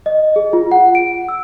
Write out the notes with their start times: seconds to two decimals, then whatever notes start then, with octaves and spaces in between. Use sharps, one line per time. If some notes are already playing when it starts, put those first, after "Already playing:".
0.06 D#5
0.36 G#4
0.53 F4
0.72 F#5
0.95 D7
1.29 E6